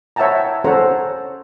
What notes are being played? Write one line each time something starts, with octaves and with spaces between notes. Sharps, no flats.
C#5 E5 F#5 G5 A5 A#5
C#4 A4 C5 C#5 F#5 A#5